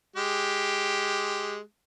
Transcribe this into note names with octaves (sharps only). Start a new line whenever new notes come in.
G#3 G4